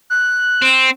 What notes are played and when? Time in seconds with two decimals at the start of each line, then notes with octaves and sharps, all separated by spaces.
0.10 F#6
0.62 C4